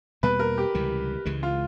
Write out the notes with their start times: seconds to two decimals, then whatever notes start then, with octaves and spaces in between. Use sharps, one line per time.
0.23 E2 B2 G3 A#3 B4
0.39 A#4
0.58 G4
0.75 C#2 C3 E3 G3
1.25 C#2 C#3 E3 G#3
1.43 F4